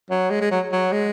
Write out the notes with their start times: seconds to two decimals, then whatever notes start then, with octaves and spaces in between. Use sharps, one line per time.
0.11 F#3
0.31 G#3
0.41 G#3
0.51 F#3
0.72 F#3
0.92 G#3